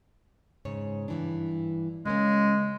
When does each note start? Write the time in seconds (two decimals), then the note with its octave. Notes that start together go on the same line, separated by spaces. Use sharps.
0.65 G#2 C#3 C#5
1.08 G2 E3 D4
2.06 C#3 G#3 A#3 C#4